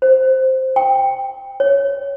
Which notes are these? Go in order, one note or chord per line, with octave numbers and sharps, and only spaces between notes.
C5
G5
C#5